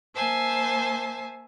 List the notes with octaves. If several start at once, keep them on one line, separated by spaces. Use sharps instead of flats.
A#3 C5 E5 G#5 A5